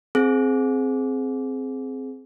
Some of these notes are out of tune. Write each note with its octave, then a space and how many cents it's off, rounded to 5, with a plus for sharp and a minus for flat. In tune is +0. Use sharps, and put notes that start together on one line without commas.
C4 +0 G#4 +20